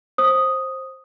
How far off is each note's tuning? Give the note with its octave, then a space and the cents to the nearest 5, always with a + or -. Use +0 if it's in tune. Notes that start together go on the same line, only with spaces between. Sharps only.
C5 +15 D#6 +0